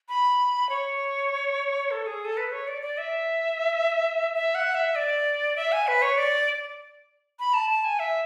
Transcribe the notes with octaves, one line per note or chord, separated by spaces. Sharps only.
B5
C#5
A4
G#4
A4
B4
C#5
D5
D5
E5
E5
F#5
E5
D5
E5
G#5
B4
C#5
D5
B5
A5
A5
G#5
E5